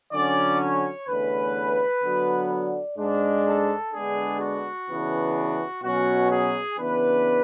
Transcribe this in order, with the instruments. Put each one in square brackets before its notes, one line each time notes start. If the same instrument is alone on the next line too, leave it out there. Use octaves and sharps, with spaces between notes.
[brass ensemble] D3 F#3 C#4 D5
C#5
E2 D3 A3 C#4 B4
D3 F#3 B3
D5
G#2 G#3 D4
A4
D3 G#3 B3 D4 G#4
F#4
C#3 E3 B3 D4
B2 F#3 C#4 F#4
G#4
C#3 E3 B3 D4 B4